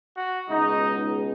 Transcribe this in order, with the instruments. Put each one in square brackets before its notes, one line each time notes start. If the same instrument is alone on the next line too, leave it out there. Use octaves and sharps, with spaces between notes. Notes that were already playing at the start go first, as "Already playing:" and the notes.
[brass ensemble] F#4
C#2 B2 G#3 D#4